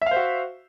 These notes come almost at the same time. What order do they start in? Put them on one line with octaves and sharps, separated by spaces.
E5 F5 C5 F#4